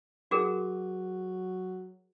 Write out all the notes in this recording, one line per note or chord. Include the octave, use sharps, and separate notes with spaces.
F#3 F#4 G#4 A#4